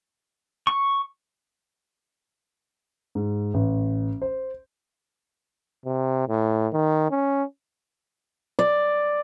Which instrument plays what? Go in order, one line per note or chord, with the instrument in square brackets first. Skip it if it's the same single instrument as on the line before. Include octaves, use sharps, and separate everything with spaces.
[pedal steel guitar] C#6
[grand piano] G#2
A1
C5
[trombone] C3
A2
D#3
C#4
[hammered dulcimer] D5